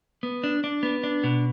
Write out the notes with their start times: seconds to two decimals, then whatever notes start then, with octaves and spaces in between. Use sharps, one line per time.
0.23 B3
0.44 D4
0.64 D4
0.83 B3
1.03 D4
1.24 B2